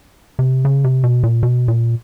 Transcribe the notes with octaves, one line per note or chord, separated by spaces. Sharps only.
C3
C#3
C3
B2
A#2
B2
A#2